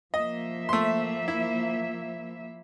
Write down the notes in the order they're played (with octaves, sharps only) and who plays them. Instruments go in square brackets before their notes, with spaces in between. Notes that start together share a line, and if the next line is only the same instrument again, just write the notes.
[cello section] F3 A#3 E5 [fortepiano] D#5
[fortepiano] A3 C6
E4